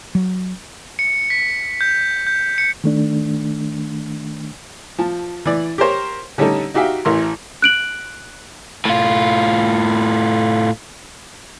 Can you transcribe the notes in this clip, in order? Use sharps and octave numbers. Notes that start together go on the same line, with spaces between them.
F#3
C#7
B6
G6
G6
C#7
D#3 A3 D4
F3 A5
E3 D5
G4 A#4 C5 C#5
D3 G3 C#4 D#4 A4
D#4 F#4 G4 E5 F5 G5
A1 E3 E4 A#4 C6
F#6 D7 F#7
A2 F4